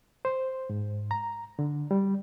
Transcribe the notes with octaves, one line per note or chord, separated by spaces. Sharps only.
C5
G#2
A#5
D3
G3